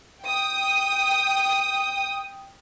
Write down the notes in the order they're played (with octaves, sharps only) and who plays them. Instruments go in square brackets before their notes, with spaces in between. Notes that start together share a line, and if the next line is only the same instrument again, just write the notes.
[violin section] G5 D#6